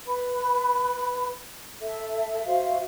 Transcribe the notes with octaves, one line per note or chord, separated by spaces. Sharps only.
B4 B5
A4 E5
F#4 C5 E5 F5